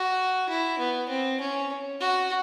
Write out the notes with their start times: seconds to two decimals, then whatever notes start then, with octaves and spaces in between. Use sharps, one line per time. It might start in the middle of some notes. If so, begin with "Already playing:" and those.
Already playing: F#4
0.49 E4
0.79 B3
1.09 C4
1.40 C#4
2.01 F#4